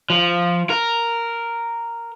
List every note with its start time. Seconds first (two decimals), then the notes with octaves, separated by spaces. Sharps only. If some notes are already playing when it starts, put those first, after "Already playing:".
0.10 F3
0.70 A#4